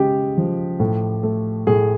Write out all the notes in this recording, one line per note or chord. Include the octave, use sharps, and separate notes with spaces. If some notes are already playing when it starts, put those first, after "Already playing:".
Already playing: C#3 G#3 G4
F3
A2
A3
A2 G#4